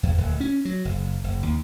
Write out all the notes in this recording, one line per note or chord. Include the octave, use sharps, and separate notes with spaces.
E2
D1
C#4
F#3
F#1
F#1
D#2